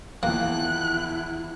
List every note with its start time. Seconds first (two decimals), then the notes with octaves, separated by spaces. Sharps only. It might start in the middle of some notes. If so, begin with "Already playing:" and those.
0.23 E2 D#3 F3 A#3 E4 F#6